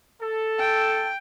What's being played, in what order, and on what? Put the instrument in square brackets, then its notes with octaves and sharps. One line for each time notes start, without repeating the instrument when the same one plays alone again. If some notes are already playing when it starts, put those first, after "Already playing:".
[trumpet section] A4
[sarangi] G5